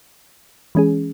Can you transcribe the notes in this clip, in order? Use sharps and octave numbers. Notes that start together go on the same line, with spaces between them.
E3 G#3 C#4 G#4